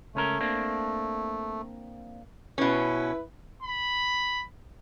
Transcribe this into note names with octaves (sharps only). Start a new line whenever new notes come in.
C#2 A3 C#4 A#4
A#3 C4 D4
B2 C#4 E4 B4
B5